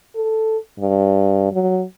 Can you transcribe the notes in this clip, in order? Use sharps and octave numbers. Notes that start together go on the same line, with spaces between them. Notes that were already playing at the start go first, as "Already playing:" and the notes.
A4
G2
F#3